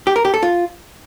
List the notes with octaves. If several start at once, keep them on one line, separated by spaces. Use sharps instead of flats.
G4
A#4
G4
A4
F4